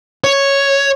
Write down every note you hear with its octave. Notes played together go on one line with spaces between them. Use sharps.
C#5